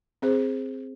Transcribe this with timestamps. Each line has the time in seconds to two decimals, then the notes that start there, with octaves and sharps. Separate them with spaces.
0.22 C4 G#4 C5